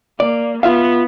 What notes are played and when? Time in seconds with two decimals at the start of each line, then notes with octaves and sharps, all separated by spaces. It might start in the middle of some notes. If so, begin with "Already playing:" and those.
0.20 A#3 D5
0.63 B3 F4 E5 F5